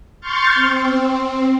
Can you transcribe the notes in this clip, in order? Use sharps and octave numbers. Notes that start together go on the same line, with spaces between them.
C6 C#6 F6 G6 A6
C4